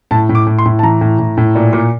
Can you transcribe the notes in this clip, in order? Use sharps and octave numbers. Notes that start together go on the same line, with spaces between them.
A2 A5
A2
D6
A2
C6
A2
A5
E3 A#5
A2
A2
A2
A#2
A#2